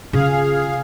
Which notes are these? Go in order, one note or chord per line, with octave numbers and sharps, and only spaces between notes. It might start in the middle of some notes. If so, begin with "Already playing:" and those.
C#3 F4 G#4 F5